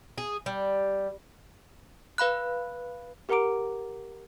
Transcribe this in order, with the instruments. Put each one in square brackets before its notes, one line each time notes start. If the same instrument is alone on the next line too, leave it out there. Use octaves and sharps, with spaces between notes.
[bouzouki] G#4
G3
[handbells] B4 F5 B5 F#6
[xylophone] G4 A#4 F#5 A#5 D6 D7